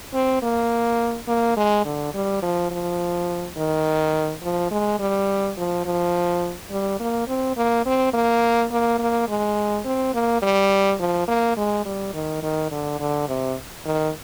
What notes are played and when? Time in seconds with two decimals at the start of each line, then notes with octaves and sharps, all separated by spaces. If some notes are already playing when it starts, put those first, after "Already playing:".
0.14 C4
0.43 A#3
1.28 A#3
1.57 G#3
1.85 D3
2.14 G3
2.43 F3
2.71 F3
3.57 D#3
4.43 F3
4.72 G#3
5.00 G3
5.57 F3
5.85 F3
6.71 G3
7.00 A#3
7.28 C4
7.57 A#3
7.86 C4
8.14 A#3
8.71 A#3
8.99 A#3
9.29 G#3
9.85 C4
10.14 A#3
10.42 G3
11.00 F3
11.28 A#3
11.57 G#3
11.86 G3
12.14 D#3
12.43 D#3
12.71 D3
13.00 D3
13.28 C3
13.86 D#3